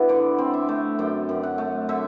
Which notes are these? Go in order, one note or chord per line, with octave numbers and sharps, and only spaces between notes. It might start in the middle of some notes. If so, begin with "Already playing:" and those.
Already playing: B3 D4 E4 F#4
D3 D5
C4
E5
A3
F#2 G5
F#2
F#5
A3
D3 E5